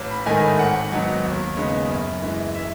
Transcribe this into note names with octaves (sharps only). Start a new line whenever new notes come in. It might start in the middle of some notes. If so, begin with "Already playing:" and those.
Already playing: A1
B5
G#2 D#3 A3 D#4 G#5
G#1 F#5
G#2 F#3 B3 D#4
D#2
C#3 G#3 B3 D#4
F#2
E3 G#3
E5